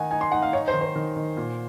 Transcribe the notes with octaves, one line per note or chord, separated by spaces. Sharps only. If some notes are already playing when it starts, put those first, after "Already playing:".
Already playing: D#3 D#4 F#5 G#5
D#4 G#5
C6
D#4 F#5
F5
D#4 C#5
C5
D#3
C5
D#3
D#3
A#2